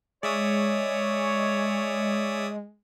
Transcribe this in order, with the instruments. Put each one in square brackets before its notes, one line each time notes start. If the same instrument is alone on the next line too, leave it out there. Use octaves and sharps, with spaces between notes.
[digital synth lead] G#3 [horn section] C#5 [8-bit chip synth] D5 E5 D#6